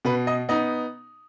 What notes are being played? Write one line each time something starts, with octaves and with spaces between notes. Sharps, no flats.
B2 B4
D#5
B3 D#4 D#5